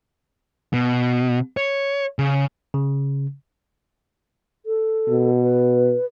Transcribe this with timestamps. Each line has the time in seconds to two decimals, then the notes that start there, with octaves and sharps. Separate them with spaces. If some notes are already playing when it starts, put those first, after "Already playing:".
0.73 B2
1.57 C#5
2.19 C#3
2.74 C#3
4.66 A4
5.09 B2
5.42 B4